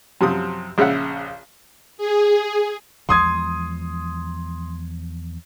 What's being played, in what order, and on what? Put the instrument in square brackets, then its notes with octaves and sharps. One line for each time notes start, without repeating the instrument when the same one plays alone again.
[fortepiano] F#2 C3 F3 D#6
A#1 C#3 C#4 E5 F#5
[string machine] G#4
[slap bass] E2 F3 G#3 [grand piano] C6 D#6 G#6